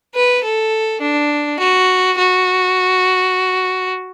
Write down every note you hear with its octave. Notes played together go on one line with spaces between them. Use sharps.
B4
A4
D4
F#4
F#4